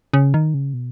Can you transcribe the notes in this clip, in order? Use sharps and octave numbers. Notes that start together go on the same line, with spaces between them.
C#3
D#3
C#3
B2